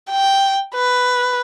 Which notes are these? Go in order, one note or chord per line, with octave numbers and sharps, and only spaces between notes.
G5
B4